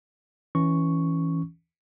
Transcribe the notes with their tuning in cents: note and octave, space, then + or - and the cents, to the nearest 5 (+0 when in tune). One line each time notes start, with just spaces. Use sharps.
E3 -10 C#4 +0 C#6 +0